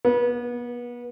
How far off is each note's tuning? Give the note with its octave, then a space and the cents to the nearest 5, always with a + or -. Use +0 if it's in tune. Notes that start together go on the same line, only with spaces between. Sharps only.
B3 -35